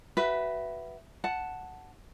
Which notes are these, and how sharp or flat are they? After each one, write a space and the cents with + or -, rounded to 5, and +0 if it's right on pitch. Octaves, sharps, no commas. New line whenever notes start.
F#4 +25 B4 +0 E5 +10
F#5 +0 A5 +0